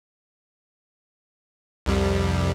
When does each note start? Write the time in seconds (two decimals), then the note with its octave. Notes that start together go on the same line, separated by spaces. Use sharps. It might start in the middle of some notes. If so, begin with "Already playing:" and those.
1.86 C2 F2 G3